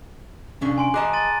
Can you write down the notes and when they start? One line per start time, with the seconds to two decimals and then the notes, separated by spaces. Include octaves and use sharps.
0.62 C3 C#4 D4
0.78 G#5 C6 D7
0.94 G#4 D#5 A5 A#5 D6 F#6
1.13 C6 A6 D#7